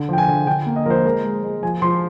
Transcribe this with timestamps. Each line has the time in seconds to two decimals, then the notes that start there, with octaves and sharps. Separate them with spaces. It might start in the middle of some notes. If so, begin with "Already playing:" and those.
Already playing: D3
0.09 F3 G5
0.18 G#5
0.28 D3
0.47 D3 G5
0.66 A#3
0.76 D#5
0.86 F3 A#4 C5
1.05 G#3 A#4
1.24 G#3
1.43 G#3
1.63 F3 G#5
1.82 F3 C6